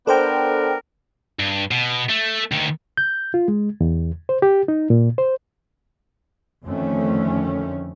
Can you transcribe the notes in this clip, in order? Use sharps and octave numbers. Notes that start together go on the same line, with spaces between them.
B3 D4 A4 A#4 C5 G5
G2
B2
A3
D2 D#3
G6
F4
G#3
E2
C5
G4
D#4
A#2
C5
F2 D3 D#3 A3 C#4